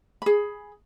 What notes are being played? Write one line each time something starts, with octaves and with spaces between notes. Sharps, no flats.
G#4 B5